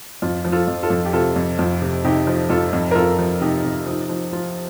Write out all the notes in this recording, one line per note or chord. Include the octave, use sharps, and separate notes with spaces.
F2 F4
F3
F4 A4
F2
F4 A4
F2
G4
C3 F4 A4
F2
F2 F4
C3
C3 D#4 G4
F3
F2 F4 A4
F2
A#4
F2 F4 A4
F3
C3 D#4 G4
C3
F3 D#4
F3
F3 F4